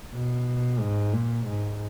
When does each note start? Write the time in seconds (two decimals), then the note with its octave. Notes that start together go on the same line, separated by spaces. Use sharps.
0.14 B2
0.80 G#2
1.13 A#2
1.47 G#2